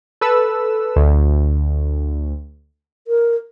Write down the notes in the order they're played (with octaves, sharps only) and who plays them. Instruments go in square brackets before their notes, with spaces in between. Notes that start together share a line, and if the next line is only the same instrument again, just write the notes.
[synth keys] A4 B4 E6
D2
[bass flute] A#4